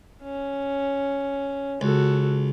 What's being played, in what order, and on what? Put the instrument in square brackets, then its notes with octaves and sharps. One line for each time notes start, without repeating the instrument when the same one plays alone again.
[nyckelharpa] C#4
[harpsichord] C#2 [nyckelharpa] F#4 A4